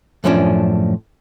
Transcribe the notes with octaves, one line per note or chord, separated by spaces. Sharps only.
F#2 A2 F3 C#4 D4